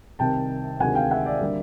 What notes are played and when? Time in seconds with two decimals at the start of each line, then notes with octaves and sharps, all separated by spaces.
0.19 C2 C3 D#3 G5 A5
0.80 D2 C3 D#3 G#3 F#5 G#5
0.95 F5 G5
1.10 E5 F#5
1.26 D5 E5
1.41 D3 G3 A#3